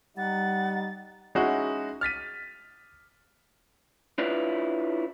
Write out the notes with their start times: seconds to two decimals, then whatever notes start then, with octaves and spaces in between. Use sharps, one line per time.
0.17 G3 D#4 F#5 A6
1.35 G#3 C#4 D#4 E4 F#4
2.01 F6 A6 B6 D#7
4.18 D4 E4 F4 B4 C#5 D5